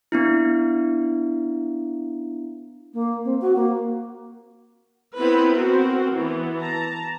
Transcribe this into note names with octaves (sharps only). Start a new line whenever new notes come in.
B3 D4 E4
A#3
C4
F#4
A#3
B3 C4 E4 B4
C4 F#4 A#4
E3 B3
A5 A#5